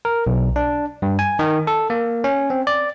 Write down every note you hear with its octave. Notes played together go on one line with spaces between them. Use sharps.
A#4
B1
D4
G2
G#5
D#3
A4
A#3
C#4
C4
D5